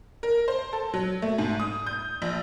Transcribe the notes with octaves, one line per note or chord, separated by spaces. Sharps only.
A#4
C5
A4
F#3
A3
G#2
D#6
G6
A#1